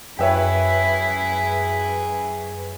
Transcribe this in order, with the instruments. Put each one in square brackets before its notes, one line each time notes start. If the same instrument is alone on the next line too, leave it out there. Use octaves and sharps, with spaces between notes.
[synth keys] F#2 B4 [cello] E4 [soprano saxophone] G#4 [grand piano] C#5 E5 G5